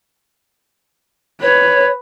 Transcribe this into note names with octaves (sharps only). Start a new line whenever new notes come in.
B4 C#5